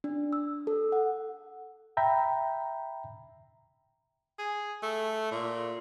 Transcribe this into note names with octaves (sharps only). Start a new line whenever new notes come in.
D4
E6
A4
F#5
E5 G5 A#5 B5
G#4
A3
A#2